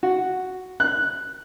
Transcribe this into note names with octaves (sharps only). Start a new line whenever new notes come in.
F#4
F#6